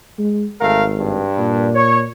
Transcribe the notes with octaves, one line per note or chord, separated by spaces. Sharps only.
G#3
G#1 A3 A#4 F5
G2
A#2
C#5